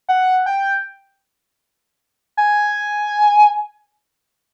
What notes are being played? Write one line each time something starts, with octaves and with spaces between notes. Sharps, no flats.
F#5
G5
G#5